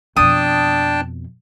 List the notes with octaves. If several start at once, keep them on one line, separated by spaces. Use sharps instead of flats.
F2 B2 D4 G5 A5 D#6